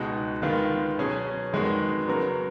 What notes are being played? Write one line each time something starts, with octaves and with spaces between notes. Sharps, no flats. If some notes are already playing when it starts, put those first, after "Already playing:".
Already playing: C#2 B2 G#3 D#4 F#4
D#3 G#3 B3 F4 B4
B2 F#3 C#4 G#4
F2 D#3 G#3 B3 F#4
C#3 F#3 B3 F#4 A#4